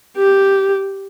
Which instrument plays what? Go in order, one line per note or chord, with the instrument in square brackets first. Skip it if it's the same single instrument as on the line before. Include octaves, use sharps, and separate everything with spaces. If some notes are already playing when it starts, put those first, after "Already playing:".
[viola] G4